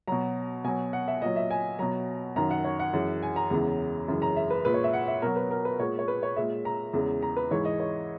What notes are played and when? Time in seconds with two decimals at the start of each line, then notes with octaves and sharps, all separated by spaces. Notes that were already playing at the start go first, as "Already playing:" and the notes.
0.08 B2 F#3 A#5
0.64 B2 F#3 G#5
0.93 F#5
1.08 E5
1.22 A#2 F#3 D#5
1.36 E5
1.51 G#5
1.79 B2 F#3 A#5
2.36 F#2 D#3 F#3 A#5
2.51 F#5
2.65 C#5
2.79 F#5
2.93 F#2 E3 G#3
3.23 G#5
3.36 A#5
3.51 E2 C#3 E3 G#3
4.08 F#2 C#3 E3 G#3
4.22 A#5
4.36 E5
4.50 B4
4.65 A#2 G#3 B4
4.74 C#5
4.84 E5
4.93 F#5
5.08 E5
5.22 B2 F#3 A#4
5.36 B4
5.51 A#4
5.65 B4
5.79 A#2 G#3 C#5
5.99 C#5
6.08 B4
6.23 C#5
6.36 A#2 G#3 E5
6.65 A#5
6.93 E2 C#3 G#3
7.22 A#5
7.37 B4
7.51 G#2 E3 G#3 C#5
7.65 D#5
7.80 C#5